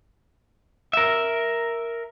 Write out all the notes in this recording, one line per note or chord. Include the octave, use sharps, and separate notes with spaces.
A#4 E5